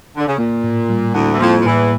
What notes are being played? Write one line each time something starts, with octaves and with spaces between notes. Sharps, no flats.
D3
C#3
A#2 A#3
A2
G3
D2 D3 E4
E3
F2 F3 A#3
F3
E2 A2 E3